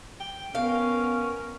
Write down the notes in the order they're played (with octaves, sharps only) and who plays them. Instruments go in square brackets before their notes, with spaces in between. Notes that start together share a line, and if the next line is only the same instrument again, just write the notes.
[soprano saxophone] G5
[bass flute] B3 [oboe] C#4 [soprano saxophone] A#4 [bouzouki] F5